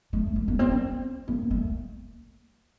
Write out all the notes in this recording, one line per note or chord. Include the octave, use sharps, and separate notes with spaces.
A3
A3
A#3
C4
C4
A#3
A3